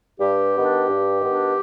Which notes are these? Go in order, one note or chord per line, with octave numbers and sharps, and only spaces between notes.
G2 G4
D#3 B3 D4
G2
D#3 B3 D4